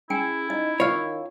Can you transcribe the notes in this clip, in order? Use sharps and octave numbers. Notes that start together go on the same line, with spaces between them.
C#4 E4 G#4 G5 G#5
D#4 D#5
D#3 F4 C#5 D#5 F5